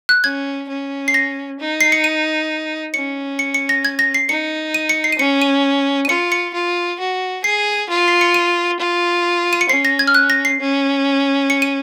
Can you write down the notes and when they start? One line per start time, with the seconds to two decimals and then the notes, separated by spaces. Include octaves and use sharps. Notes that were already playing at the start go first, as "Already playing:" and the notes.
0.09 F#6
0.24 C#4 G#6
0.69 C#4
1.08 C7
1.14 A#6
1.60 D#4
1.81 C7
1.92 C#7
2.04 D#7
2.94 C#4 C#7
3.39 C#7
3.54 C#7
3.69 A#6
3.85 G#6
3.99 A#6
4.14 C7
4.29 D#4 C#7
4.74 D#7
4.89 C#7
5.04 C7
5.12 D#7
5.19 C#4 C#7
5.42 D#7
6.05 D#7
6.09 F4 C#7
6.32 C#7
6.54 F4
6.99 F#4
7.44 G#4 C7
7.90 F4
8.08 C7
8.21 C#7
8.34 D#7
8.80 F4
9.53 D#7
9.61 C#7
9.69 C#4 C7
9.85 A#6
9.99 G#6
10.07 F6
10.15 F#6
10.30 A#6
10.45 C7
10.60 C#4
11.50 C#7
11.62 D#7